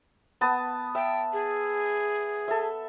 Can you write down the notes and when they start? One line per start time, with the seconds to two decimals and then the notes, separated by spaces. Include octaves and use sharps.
0.41 B3 A5 D#6
0.95 E5 G5
1.33 G#4
2.48 A4 E5